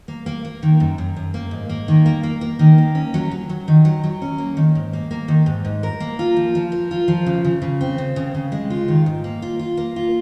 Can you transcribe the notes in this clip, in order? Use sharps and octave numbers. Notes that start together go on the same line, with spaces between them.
A#3
A#3
A#3
D#3
F#2
F#2
F#2
A#3
G#2
A#3
D#3
A#3
A#3
A#3
D#3
A#3
C#4
F#3
F#3
F#3
D#3
F#3
F#3
C#4
A#3
D#3
G#2
A#3
A#3
D#3
G#2
G#2
A#4
A#3
F4
F3
F3
A#4
F4
F3
C#3
C#3
C#3
C4
C#3
C#3
C#3
G#3
F4
D#3
G#2
A#3
F4
F4
A#3
F4